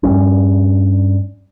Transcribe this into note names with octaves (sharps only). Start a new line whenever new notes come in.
G2 G3 C#4